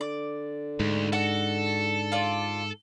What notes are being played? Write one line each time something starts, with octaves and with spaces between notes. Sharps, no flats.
D3 D5
D2 G#2
D3 F#4 A4 F#5
F4 D5